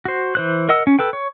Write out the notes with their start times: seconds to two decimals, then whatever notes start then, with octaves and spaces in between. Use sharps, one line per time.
0.05 F#4 C5
0.35 E3 C5 F#6
0.69 A#4 D#5 F#5 E6
0.87 C#4
0.99 A4 B4 G5
1.13 C#5